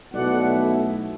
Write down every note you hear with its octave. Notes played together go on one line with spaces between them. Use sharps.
B1 B2 A3 E4 D5 F#5